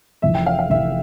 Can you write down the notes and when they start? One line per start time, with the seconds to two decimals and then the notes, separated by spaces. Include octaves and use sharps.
0.22 F1 F2 E3 E5
0.35 G5
0.46 F5
0.59 F5
0.70 F1 F2 E3 E5